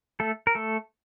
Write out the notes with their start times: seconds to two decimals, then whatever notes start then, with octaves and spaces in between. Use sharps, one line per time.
0.20 A3 A4
0.47 A#4
0.55 A3 A4